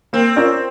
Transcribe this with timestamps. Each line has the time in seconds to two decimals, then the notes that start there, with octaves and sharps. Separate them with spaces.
0.13 A#3 C4
0.36 C#4 F4 A#4 D5